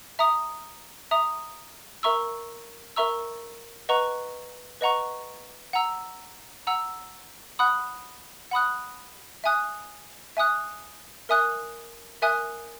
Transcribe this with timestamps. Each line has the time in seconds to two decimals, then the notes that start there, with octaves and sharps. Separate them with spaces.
0.19 E5 A#5 D#6
1.11 E5 A#5 D#6
2.03 A#4 E5 A#5 C#6 E6
2.96 A#4 E5 A#5 C#6 E6
3.89 B4 D#5 F#5 A#5 C#6
4.81 B4 D#5 F#5 A#5 C#6
5.73 F#5 A#5 E6
6.67 F#5 A#5 E6
7.59 F#5 B5 D#6 F#6
8.51 F#5 B5 D#6 F#6
9.44 E5 G#5 D#6 F#6
10.37 E5 G#5 D#6 F#6
11.29 A#4 E5 G#5 D#6 F#6
12.22 A#4 E5 G#5 D#6 F#6